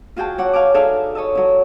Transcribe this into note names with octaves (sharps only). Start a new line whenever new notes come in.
F4 F#4 G#4 G5 A5
F#3 C#5 F#5 D6
F5 G#5 A5 D6
D#4 G#4 A4 D5 E5 F5
C#5 D#5 A5 E6
F#3 E4